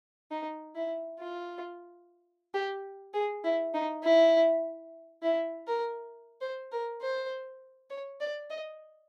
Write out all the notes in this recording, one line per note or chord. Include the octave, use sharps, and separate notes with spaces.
D#4
E4
F4
G4
G#4
E4
D#4
E4
E4
A#4
C5
A#4
C5
C#5
D5
D#5